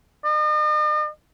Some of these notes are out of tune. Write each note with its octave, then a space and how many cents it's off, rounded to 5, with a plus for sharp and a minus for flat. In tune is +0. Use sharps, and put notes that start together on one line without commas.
D#5 -45